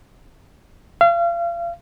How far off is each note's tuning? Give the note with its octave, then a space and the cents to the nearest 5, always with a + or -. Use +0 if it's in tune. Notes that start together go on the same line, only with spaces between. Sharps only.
F5 -35